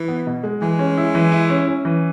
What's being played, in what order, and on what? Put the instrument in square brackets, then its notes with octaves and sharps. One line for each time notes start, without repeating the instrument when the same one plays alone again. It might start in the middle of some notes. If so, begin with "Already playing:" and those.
Already playing: [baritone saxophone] E3
[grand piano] B3
B2
G#3
[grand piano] E3 [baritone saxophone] G#3
[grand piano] C#4
E4
E3
E4
C#4
C#4
E3